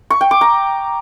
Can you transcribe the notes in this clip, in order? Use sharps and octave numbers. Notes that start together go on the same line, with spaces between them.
C#6
G5
D6
A#5